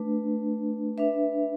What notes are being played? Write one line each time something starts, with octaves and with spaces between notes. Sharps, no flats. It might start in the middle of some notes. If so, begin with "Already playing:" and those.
Already playing: A3 D4 B4
D4 B4 E5